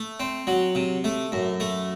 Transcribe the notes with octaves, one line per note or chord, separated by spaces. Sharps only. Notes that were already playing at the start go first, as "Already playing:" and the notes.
Already playing: A3
C4
F#3
C3
A3
F#2
A3